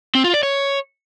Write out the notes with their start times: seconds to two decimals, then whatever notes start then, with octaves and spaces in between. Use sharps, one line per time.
0.15 C4
0.24 F4
0.34 D5
0.43 C#5